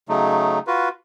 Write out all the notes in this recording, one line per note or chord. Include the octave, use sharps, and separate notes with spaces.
C#3 F#3 A3 D#4
F4 F#4 B4